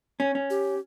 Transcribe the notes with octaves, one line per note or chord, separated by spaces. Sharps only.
C#4
C#4
G4